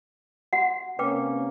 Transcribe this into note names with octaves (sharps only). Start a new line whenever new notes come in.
F#4 F#5
C3 A#3 C#4 B4 G5 D6